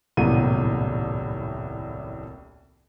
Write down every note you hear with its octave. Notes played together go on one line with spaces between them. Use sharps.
D#1 C2 F#2 A2 B3 D#7